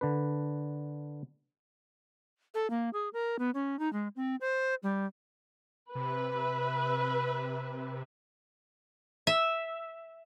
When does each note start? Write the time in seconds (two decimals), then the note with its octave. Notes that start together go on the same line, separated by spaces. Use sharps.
0.01 D3 D4 B4
2.54 A4
2.70 A#3
2.93 G#4
3.13 A#4
3.39 B3
3.54 C#4
3.79 D#4
3.93 G#3
4.16 C4
4.41 C5
4.83 G3
5.95 C3 B4 E5
9.27 E5